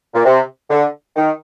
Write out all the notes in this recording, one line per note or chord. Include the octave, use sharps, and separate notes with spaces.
A#2
C3
D3
D#3